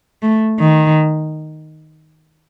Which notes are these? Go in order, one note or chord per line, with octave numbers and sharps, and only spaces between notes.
A3
D#3